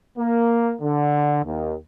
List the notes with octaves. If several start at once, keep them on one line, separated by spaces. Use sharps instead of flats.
A#3
D3
D#2